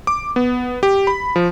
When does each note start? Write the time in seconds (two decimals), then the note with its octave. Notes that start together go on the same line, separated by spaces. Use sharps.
0.07 D6
0.36 B3
0.83 G4
1.07 B5
1.36 F3